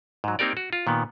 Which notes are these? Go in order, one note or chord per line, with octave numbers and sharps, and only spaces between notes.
G#2 F#3
A#3 C4 D#4 G4 A#4 D5
F#4
F4
A#2 D#3 B3